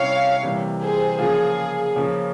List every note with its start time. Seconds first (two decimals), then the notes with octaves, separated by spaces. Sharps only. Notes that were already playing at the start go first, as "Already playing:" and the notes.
Already playing: C3 G3 C#4 E4 C#5 F5
0.43 C3 E3 G3 A#3
0.81 G#4 C5
1.19 C#3 F3 A#3 F4 G#4
1.96 C#3 F3 A#3 C#4